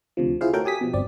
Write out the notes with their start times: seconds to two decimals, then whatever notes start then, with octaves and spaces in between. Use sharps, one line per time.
0.17 D2 C3 F3
0.41 E4 F4 G#4 C5 F5
0.53 A3 F#4 A4 A#4 C#5 G5
0.65 G4 G#5 D#6 B6
0.81 B2 F3
0.93 G1 C4 D5